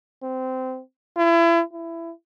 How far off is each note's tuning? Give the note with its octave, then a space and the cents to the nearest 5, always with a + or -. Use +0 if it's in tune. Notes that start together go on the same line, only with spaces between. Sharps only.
C4 -20
E4 +35
E4 +20